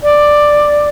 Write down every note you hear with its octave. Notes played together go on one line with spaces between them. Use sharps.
D5